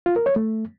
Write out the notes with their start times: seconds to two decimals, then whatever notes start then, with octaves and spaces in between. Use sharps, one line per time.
0.06 F4
0.16 A#4
0.26 C#5
0.36 A3